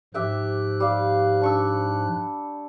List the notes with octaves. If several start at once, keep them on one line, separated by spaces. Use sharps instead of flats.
G#2 F3 G4 E5 G5 F#6
G3 F5
D4 C#6 E6